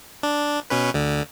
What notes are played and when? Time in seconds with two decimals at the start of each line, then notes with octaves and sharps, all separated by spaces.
0.23 D4
0.70 B2 C#4 B4
0.94 D2 D3